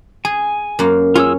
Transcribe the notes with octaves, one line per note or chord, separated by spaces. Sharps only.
G#4 G#5
F#2 A#3
C#4 F4 G#4 E6